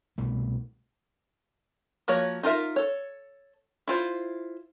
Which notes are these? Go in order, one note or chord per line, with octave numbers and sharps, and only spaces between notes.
C2 B2 A3
F3 A#3 F#4 C#5
D#4 F4 A#4 E5
A4 C#5
E4 F4 C5